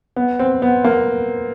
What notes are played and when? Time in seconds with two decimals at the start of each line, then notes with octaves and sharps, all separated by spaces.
0.16 B3
0.39 C4
0.62 B3
0.84 A#3